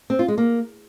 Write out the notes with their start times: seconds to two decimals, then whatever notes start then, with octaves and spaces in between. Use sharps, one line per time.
0.10 C4
0.19 F4
0.28 G#3
0.38 A#3